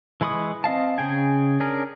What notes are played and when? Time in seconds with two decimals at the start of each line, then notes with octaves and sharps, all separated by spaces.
0.21 E3 G#3 B5 C#6 D#6
0.64 C4 D#5 F5 A5
0.98 C#3 G#4 G5 G#5
1.60 C#4 D4 G#4 A#4